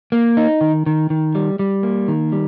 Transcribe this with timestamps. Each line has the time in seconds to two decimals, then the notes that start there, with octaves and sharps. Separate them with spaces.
0.12 A#3
0.37 D#4
0.61 D#3
0.86 D#3
1.10 D#3
1.35 G3
1.59 G3
1.83 A#3
2.08 D#3
2.32 G3